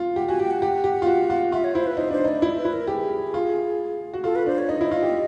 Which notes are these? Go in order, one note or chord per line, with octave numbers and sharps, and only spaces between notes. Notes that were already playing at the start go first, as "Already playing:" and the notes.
Already playing: F4
G4 F#5
F#4 G#5
G4 G5
F#5
G4
G4
F4
F#4
F4
F4 E5
C#5
E4 C5
B4
D#4 C5
D4 C5
D#4 D5
E4
B4
E4
A#4
G4 G#4
F4
F#4
F4 A4
B4
D4 C5
C#5
D#4 D#5
E4
F4
G4